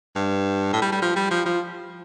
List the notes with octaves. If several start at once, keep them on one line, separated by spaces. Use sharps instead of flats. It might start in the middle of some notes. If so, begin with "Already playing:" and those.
G2
A2
G3
G3
F3
G3
F3
F3